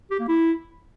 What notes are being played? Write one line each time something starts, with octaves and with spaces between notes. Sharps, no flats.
G4
A#3
E4